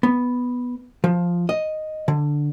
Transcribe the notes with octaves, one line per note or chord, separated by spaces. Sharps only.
B3
F3
D#5
D3